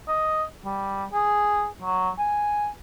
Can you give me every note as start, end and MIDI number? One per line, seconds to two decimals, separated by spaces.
0.08 0.44 75
0.65 1.04 55
1.13 1.68 68
1.82 2.10 54
2.19 2.68 80